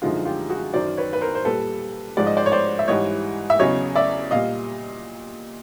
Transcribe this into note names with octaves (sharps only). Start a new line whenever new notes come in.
F#2 D3 F3 G#3 D#4 F4
F4 G4
F#4 G#4
F#2 D#3 F#3 C5 D5
B4 C#5
B4
A#4 C5
C5
A#2 G3 A4 B4
G#2 F3 G#3 D5
D#5
C5 D5
C#5
C5 D5
E5
G#2 E3 G3 C#5 D#5
E5
E2 C#3 F#3 C#5 D#5
D5 E5
A#2 G3 D#5 F5